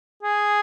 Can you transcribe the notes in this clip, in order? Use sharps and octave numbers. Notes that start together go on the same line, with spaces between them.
G#4